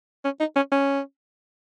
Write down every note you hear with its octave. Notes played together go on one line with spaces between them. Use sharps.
C#4
D#4
C#4
C#4